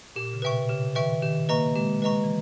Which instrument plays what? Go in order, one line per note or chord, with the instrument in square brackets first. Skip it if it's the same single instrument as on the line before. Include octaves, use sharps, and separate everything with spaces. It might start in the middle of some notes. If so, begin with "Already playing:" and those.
[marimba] A#2 [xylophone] G4
[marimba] C#3
[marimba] B2 [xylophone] B4 E5 G5 C#6
[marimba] C#3 [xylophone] G4
[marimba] D#3 [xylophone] B4 E5 G5 C#6
[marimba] D#3 [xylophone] G4
[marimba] A#3 [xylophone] B4 D#5 A#5 C#6
[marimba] G#3 [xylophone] G4
[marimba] G#3 [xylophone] B4 D#5 A#5 C#6
[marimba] E3